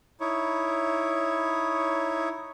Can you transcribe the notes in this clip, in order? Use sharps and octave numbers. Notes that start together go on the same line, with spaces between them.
D#4 E4 C#5